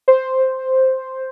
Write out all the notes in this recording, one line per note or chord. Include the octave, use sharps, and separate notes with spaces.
C5